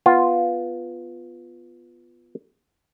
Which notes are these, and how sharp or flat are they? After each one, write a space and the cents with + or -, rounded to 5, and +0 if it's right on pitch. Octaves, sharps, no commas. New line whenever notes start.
B3 +0 F4 +0